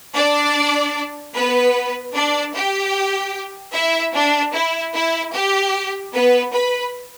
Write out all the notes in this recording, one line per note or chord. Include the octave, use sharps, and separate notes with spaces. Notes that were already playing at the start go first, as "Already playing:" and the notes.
D4 D5
B3 B4
D4 D5
G4 G5
E4 E5
D4
E4
E4
G4
B3 B4
B4 B5